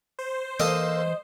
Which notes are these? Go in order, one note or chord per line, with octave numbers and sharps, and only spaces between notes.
C5
E3 A#3 A4 D#5 C6